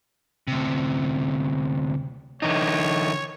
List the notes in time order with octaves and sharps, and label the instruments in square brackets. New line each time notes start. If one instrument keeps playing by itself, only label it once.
[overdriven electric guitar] D2 C3
[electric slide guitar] D3 E3 D#4 [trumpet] C#5